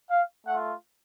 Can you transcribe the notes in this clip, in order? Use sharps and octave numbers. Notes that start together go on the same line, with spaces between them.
F5
A3 F4 F#5